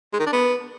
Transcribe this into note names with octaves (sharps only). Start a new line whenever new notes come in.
G#3
D#3
D4
B3